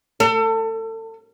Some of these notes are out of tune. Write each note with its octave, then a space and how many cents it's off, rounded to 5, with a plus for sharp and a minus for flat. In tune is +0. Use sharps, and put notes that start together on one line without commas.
A4 +30